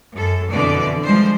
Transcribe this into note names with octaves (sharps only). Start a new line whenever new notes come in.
F#2 A4
F2 B2 D3 E3 D5
F3 G3 G#3 C5